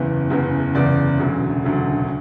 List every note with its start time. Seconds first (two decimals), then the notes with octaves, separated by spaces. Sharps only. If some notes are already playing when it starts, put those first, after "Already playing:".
Already playing: F#1 E2 C#3 E3
0.30 F#1 E2 C#3 E3
0.75 F#1 E2 C#3 E3 D5
1.20 E1 D2 C#3 F#3
1.64 E1 D2 C#3 F#3